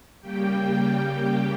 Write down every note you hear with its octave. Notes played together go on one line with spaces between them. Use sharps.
C#3 G3 A#3 G4 G5